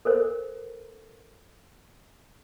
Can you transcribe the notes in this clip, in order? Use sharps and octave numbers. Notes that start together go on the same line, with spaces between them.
A4 A#4 C5